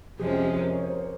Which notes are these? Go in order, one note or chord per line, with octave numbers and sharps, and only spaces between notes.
F2 C3 F3 G#3 C#4 G#4
G4
G#4
A#4
C#5
C5
A#4
C5